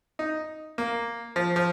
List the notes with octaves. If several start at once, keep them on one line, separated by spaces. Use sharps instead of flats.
D#4
A#3
F3
F3